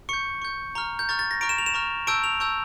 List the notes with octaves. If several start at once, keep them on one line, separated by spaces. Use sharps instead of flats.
C#6 G6 C#7
C#6 G6
A#5 C#6 F6
G6
A#5 C#6 F6 A6
A6
A#6
A#5 C#6 F6 D7
E7
F7
E7
A#5 C#6 F6
A5 C#6 E6 G6 D7
F7
A5 C#6 E6 G6